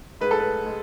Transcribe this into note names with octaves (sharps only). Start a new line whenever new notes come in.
G#2 B4
A4
B4
G#3